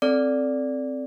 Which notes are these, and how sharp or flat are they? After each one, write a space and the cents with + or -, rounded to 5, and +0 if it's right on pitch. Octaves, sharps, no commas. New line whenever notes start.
C4 +0 A4 +0 D5 -10